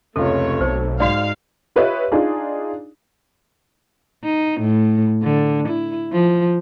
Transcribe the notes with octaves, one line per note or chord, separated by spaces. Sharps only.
F1 C#2 A3 F4 A4 C#5
B1 A4 C5
G#2 F#4 D5 F5
F4 G4 B4 C#5 D#5 E5
D4 D#4 F4 G#4
D#4
A2
D3
E4
F3